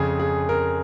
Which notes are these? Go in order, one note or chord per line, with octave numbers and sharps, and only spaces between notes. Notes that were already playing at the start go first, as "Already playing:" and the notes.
Already playing: F2 C#3 G#4
G#4
A#4